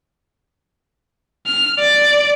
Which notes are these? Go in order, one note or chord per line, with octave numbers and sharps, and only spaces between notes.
F6
D5